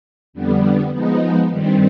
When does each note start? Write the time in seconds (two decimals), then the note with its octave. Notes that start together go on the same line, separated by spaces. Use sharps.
0.33 F2 D3 G3 B3
0.92 F3 G#3 B3 D#4
1.49 G2 D#3 G3 C4